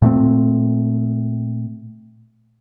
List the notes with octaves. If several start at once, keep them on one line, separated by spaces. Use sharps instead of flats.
A#2 A3 B3 C4